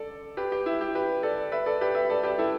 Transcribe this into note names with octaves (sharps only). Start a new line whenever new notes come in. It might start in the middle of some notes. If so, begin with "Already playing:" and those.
Already playing: A4 D5
G4 B4
G4
E4
G4
G4 B4
A4 D5
B4 E5
A4 D5
G4 B4
B4 E5
A4 D5
G4 B4
E4 A4